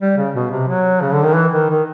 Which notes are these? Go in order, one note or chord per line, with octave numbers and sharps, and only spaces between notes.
G3
C#3
B2
C3
F#3
C#3
D3
D#3
E3
D#3
D#3